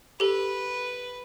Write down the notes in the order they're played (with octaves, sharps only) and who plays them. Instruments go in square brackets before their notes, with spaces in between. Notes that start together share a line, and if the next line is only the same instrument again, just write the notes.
[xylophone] G4 A4 [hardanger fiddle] B4